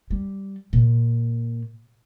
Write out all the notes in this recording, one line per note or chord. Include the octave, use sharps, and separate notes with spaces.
G3
A#2